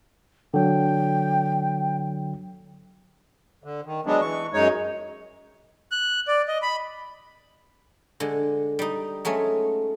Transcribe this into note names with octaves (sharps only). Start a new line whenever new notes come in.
D3 F#3 G5
D3
D#3
F#3 G#3 B3 D4
E3 C#6
F#2 G#3 D#4 C#5
F#6
D5
D#5
B5
D3 G#3
G3 D#4
F#3 G#3 A3 C#4